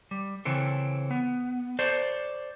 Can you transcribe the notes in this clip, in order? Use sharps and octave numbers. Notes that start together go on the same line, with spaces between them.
G3
C#3 E3 C4 A4
B3
A4 C5 D5